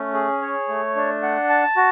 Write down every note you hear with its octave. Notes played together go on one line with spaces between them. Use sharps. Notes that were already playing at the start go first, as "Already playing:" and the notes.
Already playing: A3 C#4
G#4
C#5
A3
D4
F#5
A5
F#4